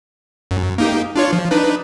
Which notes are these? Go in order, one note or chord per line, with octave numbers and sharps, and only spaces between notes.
F#2
A#3 D#4 G4
D4 F4 C#5
F3
D4 D#4 B4